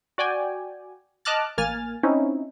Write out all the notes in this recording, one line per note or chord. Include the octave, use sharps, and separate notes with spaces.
F#4 D5 G5 G#5
D#5 A5 D6 F6 F#6 A6
A1 A#3 G#5 F6 A6
C4 C#4 D#4 E4